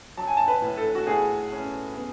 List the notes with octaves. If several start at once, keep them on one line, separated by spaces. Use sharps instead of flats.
F#3 A5
G#5
A5
B4
A2
A4
F#4
A2 G#4
C#4
B3